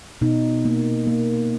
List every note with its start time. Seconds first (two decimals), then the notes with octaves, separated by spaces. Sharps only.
0.21 B2 D#4
0.65 A#3
1.07 A#3